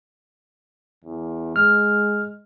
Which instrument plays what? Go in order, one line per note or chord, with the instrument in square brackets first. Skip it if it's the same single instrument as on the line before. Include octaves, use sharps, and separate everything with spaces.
[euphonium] E2
[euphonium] G#3 [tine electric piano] F6